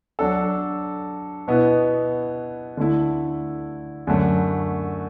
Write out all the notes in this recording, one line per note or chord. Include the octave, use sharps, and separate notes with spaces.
F#3 D4 A4
B2 B3 E4
D3 A3 E4
F#2 D3 F#3 A3